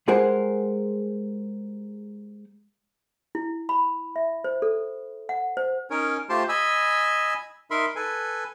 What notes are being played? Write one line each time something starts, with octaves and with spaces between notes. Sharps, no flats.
G3 G#3 G#4 A#4 C5 F#5
E4
B5
E5
C5
A4
F#5
C5
C#4 D#4 A#4 C#5
A3 F4 G4 C5 A5 C6
D#5 G#5 B5 E6
D#4 A#4 E5 B5 C6
A4 B4 G#5